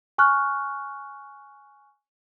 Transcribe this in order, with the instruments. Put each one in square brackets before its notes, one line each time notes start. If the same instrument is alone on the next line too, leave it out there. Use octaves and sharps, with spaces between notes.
[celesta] G#5 C#6 F6 F#6